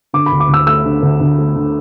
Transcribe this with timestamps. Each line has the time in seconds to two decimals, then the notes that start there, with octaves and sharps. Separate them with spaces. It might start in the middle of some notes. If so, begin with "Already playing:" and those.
0.13 D3 D6
0.26 B5
0.32 D2
0.40 D6
0.49 D2
0.54 E6
0.66 A3 E6
0.85 D3
1.03 D2
1.21 D2
1.38 A3
1.56 D3